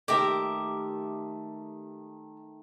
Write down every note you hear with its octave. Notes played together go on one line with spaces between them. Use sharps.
D#3 A3 D#4 G4 A#4 E5